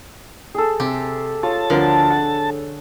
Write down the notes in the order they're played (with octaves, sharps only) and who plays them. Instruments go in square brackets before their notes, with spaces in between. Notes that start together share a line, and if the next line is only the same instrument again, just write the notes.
[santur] G#4 A4
[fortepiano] C3 [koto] G4
[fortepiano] F4 [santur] C#5 [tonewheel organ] A5
[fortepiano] D2 F3 A#4 [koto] D3
[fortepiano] F#5